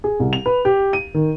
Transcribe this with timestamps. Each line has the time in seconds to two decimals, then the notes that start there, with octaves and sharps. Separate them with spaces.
0.04 G#4
0.20 C2
0.33 F7
0.46 B4
0.65 G4
0.93 D#7
1.14 D#3